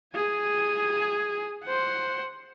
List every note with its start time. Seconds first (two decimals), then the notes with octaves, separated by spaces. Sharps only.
0.15 G#4 G#5
1.64 C5 F#5